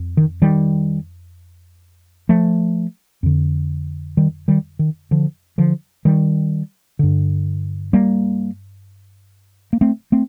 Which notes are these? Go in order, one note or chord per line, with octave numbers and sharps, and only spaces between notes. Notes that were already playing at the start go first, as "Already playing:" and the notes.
Already playing: F2
D#3
D#3 G3
F3 A3
F2 D3
D#3 G3
D#3 G3
D#3
D3 F3
D3 F3
D#3 G3
G2 D3
G3 A#3
A#3
A3 C4
A3 C4